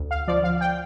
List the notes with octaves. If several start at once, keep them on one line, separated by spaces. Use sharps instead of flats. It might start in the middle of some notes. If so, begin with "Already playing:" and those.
Already playing: D2
F5
F3 D5
F5
G5